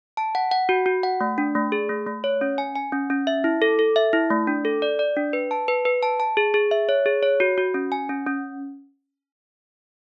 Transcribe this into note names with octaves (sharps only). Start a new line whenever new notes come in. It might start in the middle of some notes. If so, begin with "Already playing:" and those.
A5
F#5
F#5
F#4
F#4
F#5
A3
D4
A3
G#4
A3
A3
C#5
C#4
G#5
G#5
C#4
C#4
E5
E4
A4
A4
E5
E4
A3
D4
A4
D5
D5
D4
B4
A5
B4
B4
A5
A5
G#4
G#4
E5
C#5
G#4
C#5
F#4
F#4
C#4
G#5
C#4
C#4